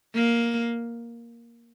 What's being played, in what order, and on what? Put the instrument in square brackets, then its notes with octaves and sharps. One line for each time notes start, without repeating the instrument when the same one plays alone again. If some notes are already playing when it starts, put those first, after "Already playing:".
[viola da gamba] A#3